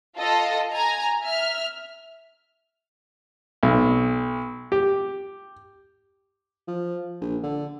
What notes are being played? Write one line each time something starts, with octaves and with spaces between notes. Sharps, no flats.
F4 A4 D#5
G#5 A#5
E5 F6
B1
G4
F3
A#1
D3